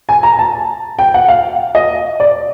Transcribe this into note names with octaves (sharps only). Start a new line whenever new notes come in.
G#5
A#5
A5
G5
F#5
F5
D#5
D5